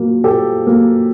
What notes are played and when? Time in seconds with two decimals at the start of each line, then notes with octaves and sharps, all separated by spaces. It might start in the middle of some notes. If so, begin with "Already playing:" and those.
Already playing: A#2 F#3 A#3
0.24 A#2 G4 A4
0.67 F#3 A#3